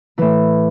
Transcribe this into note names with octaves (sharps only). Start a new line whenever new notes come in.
A2 E3 E4